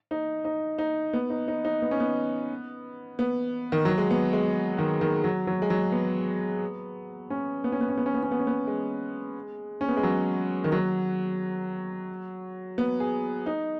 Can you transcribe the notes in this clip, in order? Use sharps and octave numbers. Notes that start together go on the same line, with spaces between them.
D#4
D#4
D#4
B3
D#4
D#4
D#4
B3
C#4
B3
B3
D#3
F#3
G#3
B3
G#3
D#3
D#3
F#3
F#3
G#3
F#3
B3
C#4
B3
C#4
B3
C#4
B3
C#4
B3
C#4
B3
C#4
B3
G#3
C#4
B3
G#3
F#3
D#3
F#3
B3
G#4
D#4